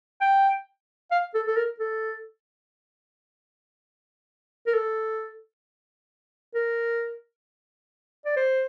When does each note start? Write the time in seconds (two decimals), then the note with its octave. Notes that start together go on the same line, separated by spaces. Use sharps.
0.21 G5
1.11 F5
1.35 A4
1.47 A4
1.57 A#4
1.80 A4
4.67 A#4
4.74 A4
6.55 A#4
8.25 D5
8.36 C5